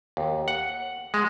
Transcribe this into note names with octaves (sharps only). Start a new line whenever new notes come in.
D#2
F#5
G#3